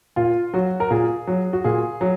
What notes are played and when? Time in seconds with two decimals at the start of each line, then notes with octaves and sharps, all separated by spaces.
0.16 A#2 F4
0.54 F#3 F#4
0.80 A#4
0.90 A#2 G#4
1.27 F#3
1.53 F#4
1.64 A#2 G#4
2.01 F#3